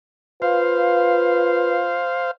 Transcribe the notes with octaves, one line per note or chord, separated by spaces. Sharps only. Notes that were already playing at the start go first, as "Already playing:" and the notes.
F4 B4 C5 F5